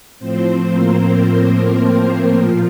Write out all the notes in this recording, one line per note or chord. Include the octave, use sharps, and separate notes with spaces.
A2 F3 C4 C5
A#3 A#4
A#3 A#4
A#2 F3 F4